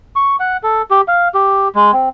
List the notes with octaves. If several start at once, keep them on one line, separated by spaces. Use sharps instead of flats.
C#6
F#5
A4
G4
F5
G4
G#3
C4